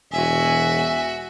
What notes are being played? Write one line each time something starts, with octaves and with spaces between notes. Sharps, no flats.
E1 F#4 E5 G#5